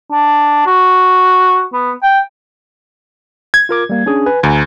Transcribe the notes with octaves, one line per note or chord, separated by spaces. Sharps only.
D4
F#4
B3
G5
G#6
F4 A#4 D6
G3 A#3
C#4 D4 G#4
B4 G#5
D2 G#5 A#5